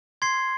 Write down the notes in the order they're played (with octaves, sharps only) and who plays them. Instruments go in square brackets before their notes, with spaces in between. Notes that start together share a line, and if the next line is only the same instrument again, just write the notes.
[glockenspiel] C6 G#6 C7